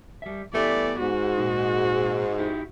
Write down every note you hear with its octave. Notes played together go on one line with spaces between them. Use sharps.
G3 E5
E3 G3 A3 B3 G4 B4 D5
G#2 F#4
A#2 D#4
D#4 E4 G4